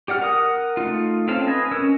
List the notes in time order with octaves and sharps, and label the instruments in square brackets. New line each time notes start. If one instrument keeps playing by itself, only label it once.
[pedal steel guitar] G4 D5 F#5 F6
A#4 F#5 D#6
A3 D#4 F4
C4 C#4 A4 F5
B4 D#5 G#5
C#4 A#4 E6